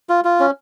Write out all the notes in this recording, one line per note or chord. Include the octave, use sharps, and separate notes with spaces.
F4
F4
C#4